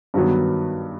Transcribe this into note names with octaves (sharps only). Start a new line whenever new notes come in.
G2 D#3 F#3 B3